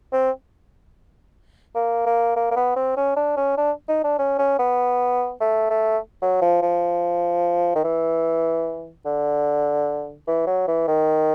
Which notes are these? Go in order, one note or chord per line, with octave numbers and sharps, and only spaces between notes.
C4
A#3
A#3
A#3
A#3
B3
C4
C#4
D4
C#4
D4
D#4
D4
C#4
C#4
B3
A3
A3
F#3
F3
F3
D#3
E3
D3
E3
F#3
E3
D#3